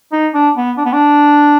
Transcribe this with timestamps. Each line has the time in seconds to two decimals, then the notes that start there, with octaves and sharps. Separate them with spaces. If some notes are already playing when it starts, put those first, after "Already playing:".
0.12 D#4
0.34 D4
0.56 B3
0.78 D4
0.85 B3
0.93 D4